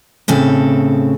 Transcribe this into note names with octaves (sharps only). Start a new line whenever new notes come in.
A2 C#3 C4 A4